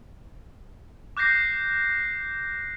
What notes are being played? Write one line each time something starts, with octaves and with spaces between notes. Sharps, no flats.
D6 F#6 G6 A#6 C7